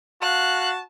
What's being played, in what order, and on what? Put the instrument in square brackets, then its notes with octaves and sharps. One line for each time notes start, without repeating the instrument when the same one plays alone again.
[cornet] F#4 [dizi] F5 [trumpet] A5 [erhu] F#6